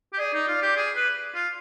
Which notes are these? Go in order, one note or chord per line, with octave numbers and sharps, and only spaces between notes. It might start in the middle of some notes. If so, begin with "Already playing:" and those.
G4
G#4 D5
D#4
F4
G4
G#4
B4
F4